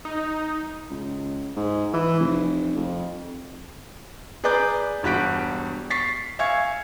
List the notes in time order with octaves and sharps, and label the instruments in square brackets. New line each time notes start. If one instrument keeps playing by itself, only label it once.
[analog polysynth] D#4
[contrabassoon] C#2
G#2
E3
F1
F2
[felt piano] G#4 B4 D5 A#5 D6 G6
E1 G2 F#4 F#6 B6 D7
C#6 A6 B6 C7
E5 F5 G#5 C#6 G#6 C#7